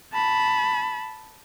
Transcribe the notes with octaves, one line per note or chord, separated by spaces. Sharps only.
A5 B5